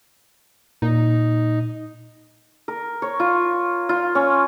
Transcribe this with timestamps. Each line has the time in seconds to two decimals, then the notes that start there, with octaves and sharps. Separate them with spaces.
0.82 A#2 D#4
2.68 A#4
3.02 C#5
3.20 F4
3.89 F4
4.15 C#4